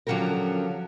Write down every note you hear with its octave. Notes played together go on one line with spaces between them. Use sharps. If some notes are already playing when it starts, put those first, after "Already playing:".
D3 F3 F#3 C#4 G4 A#4